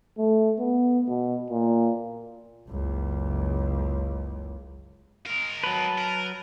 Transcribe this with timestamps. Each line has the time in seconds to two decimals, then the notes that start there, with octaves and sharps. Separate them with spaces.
0.18 A3
0.59 B3
1.08 B2
1.50 A#2
2.69 F#1 C#2
5.26 G#3 A#4
5.64 F#3 B4 A5
5.98 A#4